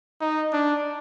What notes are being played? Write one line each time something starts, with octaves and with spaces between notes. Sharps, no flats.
D#4
D4